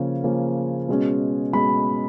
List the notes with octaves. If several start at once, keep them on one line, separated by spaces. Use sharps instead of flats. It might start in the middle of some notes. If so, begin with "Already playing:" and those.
Already playing: C#3 F3 A#3 C#4
C#3 F3 A#3 C#4
B2 G#3 C#4
B2 G#3 C#4 B5